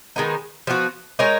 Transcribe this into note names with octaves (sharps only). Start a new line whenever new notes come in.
D#3 G#3 B3 D#4
F3 B3 F#4
G#3 D#4 A#4 C#5